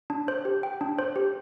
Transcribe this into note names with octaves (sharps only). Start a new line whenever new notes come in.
D4
C5
G4
G5
D4
C5
G4